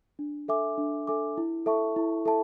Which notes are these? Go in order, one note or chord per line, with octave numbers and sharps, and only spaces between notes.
D4
A4 E5 G#5 D6
D4
A4 E5 G#5 D6
E4
A4 E5 A5 C#6
E4
A4 E5 A5